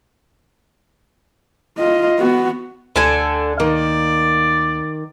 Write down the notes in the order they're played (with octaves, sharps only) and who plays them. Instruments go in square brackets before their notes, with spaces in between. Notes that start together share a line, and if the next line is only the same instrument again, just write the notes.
[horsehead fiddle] F4 D#5
B3 F#4
[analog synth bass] D2 [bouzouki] D3 A4 G#5
[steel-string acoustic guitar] D#3 [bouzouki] A#3 [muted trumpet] D5